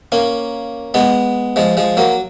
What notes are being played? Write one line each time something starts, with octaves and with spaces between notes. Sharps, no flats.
A#3 C#4
G#3 B3
F3 G#3
F3 G#3
F#3 A#3